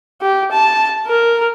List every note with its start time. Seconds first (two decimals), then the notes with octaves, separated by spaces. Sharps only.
0.21 G4
0.52 A5
1.07 A#4